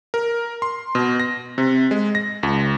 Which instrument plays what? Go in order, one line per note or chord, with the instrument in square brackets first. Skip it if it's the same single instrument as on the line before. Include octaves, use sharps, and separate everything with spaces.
[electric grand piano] A#4
C6
B2
A#6
C3
G#3
A#6
C#2